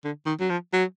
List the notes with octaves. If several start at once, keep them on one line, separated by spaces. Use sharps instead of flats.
D3
D#3
F#3
F3
F#3